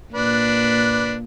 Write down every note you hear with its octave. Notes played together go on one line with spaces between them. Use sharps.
A#2 D4 B4